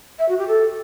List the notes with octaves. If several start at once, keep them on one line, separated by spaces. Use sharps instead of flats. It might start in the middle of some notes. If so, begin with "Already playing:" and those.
E5
F#4
G4
A4